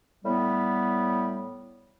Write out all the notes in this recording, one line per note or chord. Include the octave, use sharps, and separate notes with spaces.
A2 G3 B3